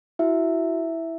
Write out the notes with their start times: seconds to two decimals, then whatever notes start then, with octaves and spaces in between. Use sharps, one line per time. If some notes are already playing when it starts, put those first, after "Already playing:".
0.19 E4 F#4 E5